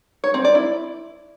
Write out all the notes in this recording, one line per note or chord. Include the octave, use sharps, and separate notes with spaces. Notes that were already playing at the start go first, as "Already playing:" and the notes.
C#5
C4
D5
E4